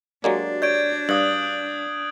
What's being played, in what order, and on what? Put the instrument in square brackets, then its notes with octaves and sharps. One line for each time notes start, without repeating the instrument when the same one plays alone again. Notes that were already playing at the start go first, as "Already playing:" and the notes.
[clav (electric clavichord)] F#3 G#3 A#3 [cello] D4 [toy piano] F#4 G4 D5
[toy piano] C#5 D5 C#6 [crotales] G6 G#6 D7
[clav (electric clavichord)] G2 [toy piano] D5 F5 [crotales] D#6 F#6 F#7